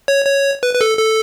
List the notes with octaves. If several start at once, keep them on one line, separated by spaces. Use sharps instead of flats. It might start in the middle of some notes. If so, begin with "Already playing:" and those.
C#5
C#5
B4
B4
A4
A4